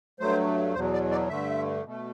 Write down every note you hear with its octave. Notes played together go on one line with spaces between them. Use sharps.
G2 F#3 A3 C5
E2 B2 F#3 C5
D5
D5
G2 D3 A3 E5
B2 A3